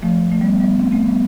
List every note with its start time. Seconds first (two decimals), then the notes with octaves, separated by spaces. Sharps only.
0.03 F3 A3
0.32 A3
0.41 G3 B3
0.60 G3 B3
0.79 A3 C4
0.91 A3 C4
1.04 G3 B3